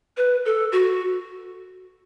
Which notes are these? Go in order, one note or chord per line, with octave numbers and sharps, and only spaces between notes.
B4
A4
F#4